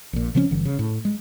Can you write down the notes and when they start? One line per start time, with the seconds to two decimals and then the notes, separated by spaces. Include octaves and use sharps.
0.13 A#1 A#2
0.35 C#3 F3 C4 C#4
0.51 G1 D3 E3
0.65 C#3
0.79 A2
1.05 G#3